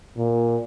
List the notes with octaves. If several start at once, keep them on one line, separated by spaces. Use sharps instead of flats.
A#2